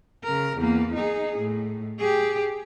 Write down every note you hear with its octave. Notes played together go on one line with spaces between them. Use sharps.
C#3 A#4
E2 A#3
D#4 G#4
A2
G4 G#4